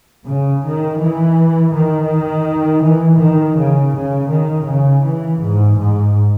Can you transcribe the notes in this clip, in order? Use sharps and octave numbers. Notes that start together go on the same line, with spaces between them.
C#3
D#3
E3
D#3
E3
D#3
C#3
C#3
D#3
C#3
E3
G#2
G#2